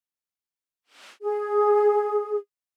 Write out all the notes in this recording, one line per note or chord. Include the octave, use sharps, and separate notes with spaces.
G#4